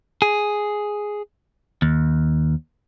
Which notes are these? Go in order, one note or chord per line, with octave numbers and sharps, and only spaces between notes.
G#4
D#2